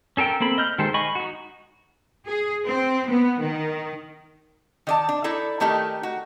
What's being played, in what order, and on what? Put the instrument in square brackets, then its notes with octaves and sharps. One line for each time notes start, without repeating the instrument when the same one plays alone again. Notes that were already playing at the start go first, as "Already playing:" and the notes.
[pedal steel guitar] C#4 A4 A#4 G5
A#3 C4 A4 B5
D#5 F6 G6
D#3 G#3 G4 A4 C5
D#5 G#5 B5 C#6
D#4 F#4
[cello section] G#4
C4
B3
D#3
[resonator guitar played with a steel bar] D#3 D5 A5
D4
D#4 E4 A4 D5
D#3 A3 D#4 G4 A#4
F#4